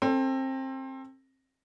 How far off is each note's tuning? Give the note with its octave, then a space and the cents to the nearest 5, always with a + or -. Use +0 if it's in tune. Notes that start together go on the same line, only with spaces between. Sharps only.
C4 +25 A4 +15